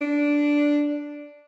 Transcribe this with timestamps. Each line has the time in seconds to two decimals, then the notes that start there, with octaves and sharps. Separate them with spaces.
0.01 D4